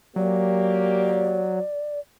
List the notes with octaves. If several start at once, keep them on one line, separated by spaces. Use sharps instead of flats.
F#3 A#3 G4 D5